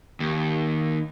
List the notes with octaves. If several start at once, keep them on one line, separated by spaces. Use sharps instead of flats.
D#2